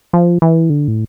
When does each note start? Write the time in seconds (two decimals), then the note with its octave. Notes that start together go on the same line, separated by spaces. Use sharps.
0.13 F3
0.42 E3
0.70 D3
0.88 A2